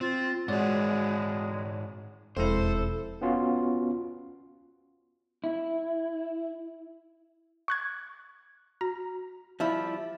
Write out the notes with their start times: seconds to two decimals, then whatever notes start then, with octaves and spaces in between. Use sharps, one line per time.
0.01 C4 F4
0.48 G#2 G#3 F#4 C#5 D5 F#5
2.37 E1 F2 G#3 E4 A4 C5
3.21 B3 C#4 F4 F#4
5.44 E4
7.68 C#6 F#6 G#6
8.81 F#4 A#5
9.60 F3 G3 E4